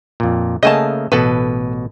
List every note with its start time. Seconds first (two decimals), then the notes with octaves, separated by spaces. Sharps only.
0.20 F2 A#2
0.63 C#3 A3 A#3 D#5 G#5 A5
1.12 A1 B2 A4 B4